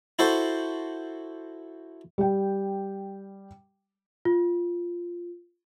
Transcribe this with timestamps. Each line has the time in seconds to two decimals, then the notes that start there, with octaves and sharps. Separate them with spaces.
0.19 E4 F#4 A4 C5
2.18 G3 G5
4.25 F4